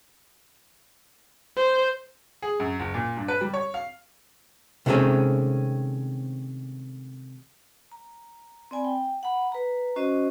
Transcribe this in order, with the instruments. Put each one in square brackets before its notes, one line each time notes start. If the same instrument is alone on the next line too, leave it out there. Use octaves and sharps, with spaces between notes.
[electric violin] C5
[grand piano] G#4
F#2
F#1
A#2
G2
B4
G3
C#5
F5
[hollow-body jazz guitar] C3 D#3 G#3 A3 C4 C#4
[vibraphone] A#5
C4 D5 G#5 B5
G5
F#5 A#5 B5
B4 A#5
C#4 F#4 C5 D#5